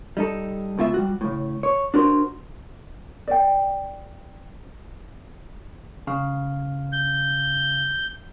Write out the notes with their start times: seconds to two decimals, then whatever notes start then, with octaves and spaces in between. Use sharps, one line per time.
0.17 G3 D#4 A4
0.77 C#2 B2 F4 E5
0.94 G3 F#4
1.21 A2 C#3
1.63 C#5
1.94 D4 F#4 A#4 C5
3.28 D5 G5
6.07 C#3 F5
6.93 G6